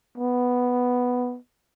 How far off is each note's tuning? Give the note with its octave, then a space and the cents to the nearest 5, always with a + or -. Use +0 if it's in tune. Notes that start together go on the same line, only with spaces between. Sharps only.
B3 +0